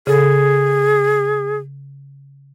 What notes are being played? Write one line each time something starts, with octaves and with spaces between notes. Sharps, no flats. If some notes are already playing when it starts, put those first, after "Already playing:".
C#3 G#4 A4